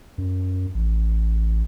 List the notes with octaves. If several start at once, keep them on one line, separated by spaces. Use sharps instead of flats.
F#2
A1